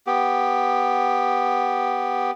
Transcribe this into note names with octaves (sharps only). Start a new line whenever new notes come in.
B3 G4